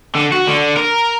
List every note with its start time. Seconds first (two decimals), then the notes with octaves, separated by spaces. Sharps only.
0.15 D3
0.32 F#4
0.47 D3
0.77 A#4